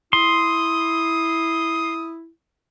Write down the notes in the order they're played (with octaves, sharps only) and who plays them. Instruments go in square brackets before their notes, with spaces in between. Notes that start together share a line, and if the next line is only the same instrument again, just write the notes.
[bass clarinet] E4 [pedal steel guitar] C6 [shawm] D#6